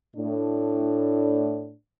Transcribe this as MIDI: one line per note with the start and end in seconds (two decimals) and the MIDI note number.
0.16 1.74 45
0.16 1.74 62